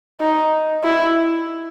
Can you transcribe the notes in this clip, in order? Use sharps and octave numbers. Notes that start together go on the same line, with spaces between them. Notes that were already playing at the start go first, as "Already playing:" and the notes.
D#4
E4